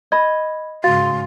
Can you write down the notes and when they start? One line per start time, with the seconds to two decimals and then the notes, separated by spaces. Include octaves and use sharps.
0.12 D#5 B5 G#6
0.84 G#2 C#3 F#4 F5 C6 A6